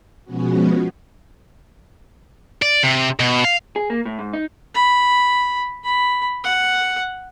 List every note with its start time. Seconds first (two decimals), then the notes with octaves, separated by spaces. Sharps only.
0.25 B2 F3 G#3 B3 C#4 F#4
2.62 D5
2.83 C3
3.20 B2
3.45 F5
3.76 G#4
3.90 A#3
4.05 A2
4.19 G#2
4.33 D#4
4.74 B5
5.84 B5
6.44 F#5